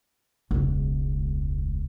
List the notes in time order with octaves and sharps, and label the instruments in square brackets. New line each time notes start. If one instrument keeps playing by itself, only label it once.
[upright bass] E1 C#2